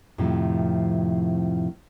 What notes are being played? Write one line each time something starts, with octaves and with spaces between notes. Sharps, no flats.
F2 A2 C3 D#3 F3